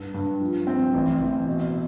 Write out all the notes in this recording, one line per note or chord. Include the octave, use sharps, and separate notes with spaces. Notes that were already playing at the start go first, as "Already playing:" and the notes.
Already playing: G2
G2
F3
C4
A1
A1
B2